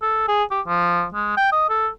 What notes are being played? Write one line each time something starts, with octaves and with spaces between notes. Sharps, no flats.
A4
G#4
G4
F3
G#3
G5
D#5
A4